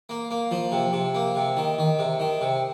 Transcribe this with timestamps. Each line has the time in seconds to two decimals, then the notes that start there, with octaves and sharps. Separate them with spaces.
0.09 A#3
0.31 A#3
0.51 F3
0.72 C3
0.93 C3
1.15 A#3
1.36 C3
1.57 D#3
1.78 D#3
1.99 C3
2.20 D#3
2.41 C3